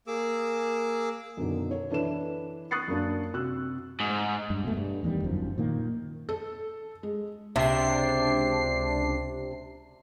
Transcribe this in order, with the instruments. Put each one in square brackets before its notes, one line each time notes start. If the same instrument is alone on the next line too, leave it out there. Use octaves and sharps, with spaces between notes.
[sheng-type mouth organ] A#3 G#4 D6 E6
[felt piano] F#2 B2 D3 D#3
C#5
E3 D4 A4 B4 E7
C#6 D#6 F#6 A6 C7 C#7
F#2 A#3 D4
C3 F#4 E6 F#6
[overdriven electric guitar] G#2
[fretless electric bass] G2
B2 A3
G2
A1 E2 D#3 G3
G1 F#2 D#3 F3
A#2 D#3 A#3
[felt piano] A4
G#3
[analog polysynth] C#2 D4 C7 [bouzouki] C3